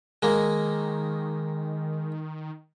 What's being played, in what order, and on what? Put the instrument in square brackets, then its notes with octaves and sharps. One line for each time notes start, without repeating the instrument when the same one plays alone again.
[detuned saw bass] D#3 [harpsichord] G#3 A#3